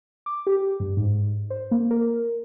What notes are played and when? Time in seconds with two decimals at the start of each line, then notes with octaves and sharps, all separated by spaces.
0.26 D6
0.47 G4
0.80 G2
0.97 G#2
1.50 C5
1.71 A#3
1.91 A#4